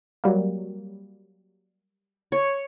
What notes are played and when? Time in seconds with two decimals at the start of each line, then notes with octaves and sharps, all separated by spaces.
0.24 F#3 G3 A#3
2.32 C#5